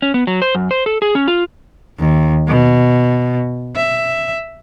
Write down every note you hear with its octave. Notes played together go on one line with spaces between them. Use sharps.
C#4
B3
F#3
C5
F#2
C5
A4
G#4
C#4
F4
D#2
B2
E5